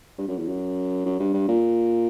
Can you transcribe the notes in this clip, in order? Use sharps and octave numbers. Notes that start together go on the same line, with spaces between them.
G2
F#2
E2
F#2
F#2
G2
G2
A#2